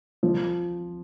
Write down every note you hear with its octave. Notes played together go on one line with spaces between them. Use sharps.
F3